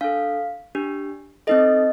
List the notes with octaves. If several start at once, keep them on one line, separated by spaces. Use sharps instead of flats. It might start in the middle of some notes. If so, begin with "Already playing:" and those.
D4 A4 F5
D4 G4
C4 D#4 A4 D#5